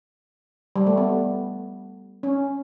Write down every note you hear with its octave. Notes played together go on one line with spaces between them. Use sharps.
G3
A3
B3
C#4